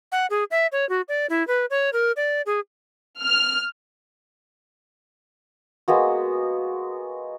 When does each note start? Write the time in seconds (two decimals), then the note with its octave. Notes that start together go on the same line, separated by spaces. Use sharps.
0.12 F#5
0.30 G#4
0.51 E5
0.72 C#5
0.89 F#4
1.08 D5
1.30 E4
1.47 B4
1.70 C#5
1.93 A#4
2.16 D5
2.46 G#4
3.23 F6
5.88 G#3 A#3 B3 F#4